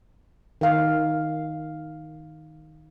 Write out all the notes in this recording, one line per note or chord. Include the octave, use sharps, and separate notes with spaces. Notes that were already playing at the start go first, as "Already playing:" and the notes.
D#3 F5